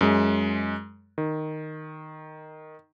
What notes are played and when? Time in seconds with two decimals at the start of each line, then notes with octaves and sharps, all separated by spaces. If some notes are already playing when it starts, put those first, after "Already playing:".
0.01 F#2 G#3
1.18 D#3